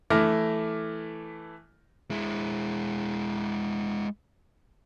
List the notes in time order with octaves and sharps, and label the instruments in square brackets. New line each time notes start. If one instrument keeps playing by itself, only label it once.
[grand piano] E3 A3 E4 D6 F6 A#6
[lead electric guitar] G#3 E4